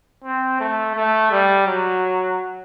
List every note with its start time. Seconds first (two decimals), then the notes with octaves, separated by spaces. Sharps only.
0.24 C4
0.60 A3
0.96 A3
1.31 G3
1.67 F#3